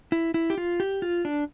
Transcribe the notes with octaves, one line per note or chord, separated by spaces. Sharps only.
E4
E4
G4
F4
G4
F4
D4